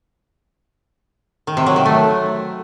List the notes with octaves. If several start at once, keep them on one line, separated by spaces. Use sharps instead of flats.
D#3
C3
F#3
D#3
A3